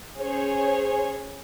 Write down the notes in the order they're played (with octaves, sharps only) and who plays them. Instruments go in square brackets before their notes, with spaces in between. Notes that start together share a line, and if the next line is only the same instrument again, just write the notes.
[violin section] C#4 G#4 C5 C#5